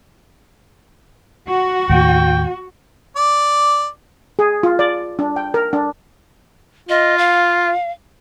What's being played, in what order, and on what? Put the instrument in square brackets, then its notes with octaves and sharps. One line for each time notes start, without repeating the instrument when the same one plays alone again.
[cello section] F#4
[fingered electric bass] D#2 A2 [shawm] G5
[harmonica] D5 D6
[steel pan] G#4
F4
D5
D4
G5
A#4
D4
[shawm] F4 [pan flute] D#5
[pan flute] F5